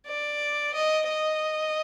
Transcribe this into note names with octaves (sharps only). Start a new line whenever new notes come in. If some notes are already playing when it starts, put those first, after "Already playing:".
D5
D#5
D#5